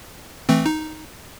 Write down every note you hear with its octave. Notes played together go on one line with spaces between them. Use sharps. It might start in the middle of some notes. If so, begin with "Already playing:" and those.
E3 A3 C4
D#4